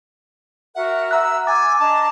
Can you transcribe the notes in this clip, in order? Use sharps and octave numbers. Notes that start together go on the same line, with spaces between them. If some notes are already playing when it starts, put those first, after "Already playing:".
F#4 A#4 E5 F#5
F#5 A#5 E6 F#6
G#5 D6 E6 A6
D4 D#5 A5 A#5